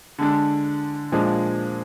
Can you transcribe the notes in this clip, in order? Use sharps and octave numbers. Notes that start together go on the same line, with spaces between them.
D3 G#3 D4
A#2 F3 G#3 D4